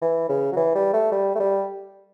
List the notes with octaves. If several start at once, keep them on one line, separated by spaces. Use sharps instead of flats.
E3
C#3
F#3
E3
G3
A3
G3
A3
G3